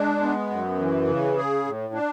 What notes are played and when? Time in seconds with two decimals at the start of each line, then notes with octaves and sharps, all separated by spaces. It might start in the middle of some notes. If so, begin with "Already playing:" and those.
Already playing: G#3 D4
0.22 B3
0.50 F#2
0.79 E3
1.08 C#3
1.37 G#4
1.65 A2
1.94 D4